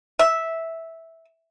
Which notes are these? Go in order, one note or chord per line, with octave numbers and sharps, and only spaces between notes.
E5